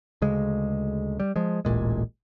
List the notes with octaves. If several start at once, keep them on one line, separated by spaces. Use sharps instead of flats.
D2 C#3 G#3
G3
F3 G#3
D1 A1 A#2 G#3